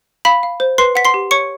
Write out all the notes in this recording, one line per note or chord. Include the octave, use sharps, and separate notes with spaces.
F5 B5 B6
F5
C5
B4 C6 C7
F#5 B6
C6 C7
G4
C#5 C#6 C#7